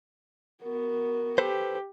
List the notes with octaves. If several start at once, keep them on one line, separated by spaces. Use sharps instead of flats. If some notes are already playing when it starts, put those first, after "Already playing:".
B3 F#4 A#4
G4 A4 B4 C5